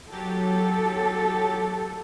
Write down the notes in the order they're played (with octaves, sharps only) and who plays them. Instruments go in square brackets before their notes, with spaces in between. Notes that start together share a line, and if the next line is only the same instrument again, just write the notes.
[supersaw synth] F#3 G4 A6 [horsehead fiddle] A4